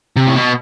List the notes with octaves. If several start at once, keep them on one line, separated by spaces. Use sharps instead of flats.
C3
A2
B2